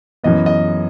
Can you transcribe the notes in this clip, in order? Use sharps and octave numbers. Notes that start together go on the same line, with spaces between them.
F#2 E3 B3 D#5
D#5